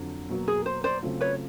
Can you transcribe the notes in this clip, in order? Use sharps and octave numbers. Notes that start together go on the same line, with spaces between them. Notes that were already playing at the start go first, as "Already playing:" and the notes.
Already playing: F2 D3 F#3
B2 F#3 A#3
G#4
C5
C5 D5
C#3 F#3 A3 C4 F4
B4 C#5